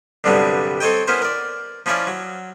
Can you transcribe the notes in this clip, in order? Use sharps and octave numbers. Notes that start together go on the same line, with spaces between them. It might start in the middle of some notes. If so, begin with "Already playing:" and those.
C2 G2 D3 F#3 G3 B3
C4 A4 C#5 D#5 G5
B3 C#4 E4 A#4 C5
A#4 D5
F3 C#4 E4 C#5 D5
F#3